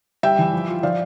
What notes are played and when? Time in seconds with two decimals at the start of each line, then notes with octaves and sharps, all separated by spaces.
0.23 G3 E5 G5
0.39 E3
0.53 F3
0.68 F4
0.83 F3 D5 F5